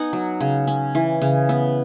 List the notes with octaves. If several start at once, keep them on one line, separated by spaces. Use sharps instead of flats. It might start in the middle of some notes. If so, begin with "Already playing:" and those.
Already playing: B3 D#4 F#5 G#5 A#5
F#3
C#3
C#4
E3
C#3
B3